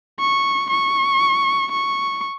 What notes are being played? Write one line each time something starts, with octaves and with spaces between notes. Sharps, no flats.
C#6
C#6
C#6